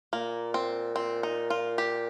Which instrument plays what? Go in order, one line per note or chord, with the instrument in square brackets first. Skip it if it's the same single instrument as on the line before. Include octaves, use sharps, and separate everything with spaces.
[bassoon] A#2 [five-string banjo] A#3
[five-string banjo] C4
C4
D#4
F4
G4